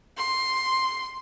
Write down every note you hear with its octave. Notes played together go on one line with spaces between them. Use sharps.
C6